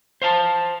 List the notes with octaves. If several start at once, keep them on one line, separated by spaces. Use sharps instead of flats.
C5 F5 A5